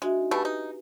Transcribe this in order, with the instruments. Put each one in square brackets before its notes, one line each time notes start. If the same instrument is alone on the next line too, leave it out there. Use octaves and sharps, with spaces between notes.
[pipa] G#3 [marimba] D4 F#4 E5
[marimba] D#4 F#4
[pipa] B2 G3 A3 [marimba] G4 B4 G#5
[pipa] D#4